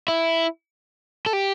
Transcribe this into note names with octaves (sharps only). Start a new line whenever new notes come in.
E4
A4
G4